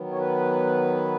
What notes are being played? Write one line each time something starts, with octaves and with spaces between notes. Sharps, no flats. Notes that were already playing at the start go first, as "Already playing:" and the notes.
Already playing: D#3 F#3 B3
C#5
B4